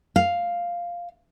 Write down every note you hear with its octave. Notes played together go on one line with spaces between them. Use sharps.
F5